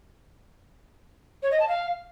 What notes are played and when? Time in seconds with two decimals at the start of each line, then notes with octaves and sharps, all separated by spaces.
1.42 C#5
1.51 D#5
1.59 A5
1.68 F5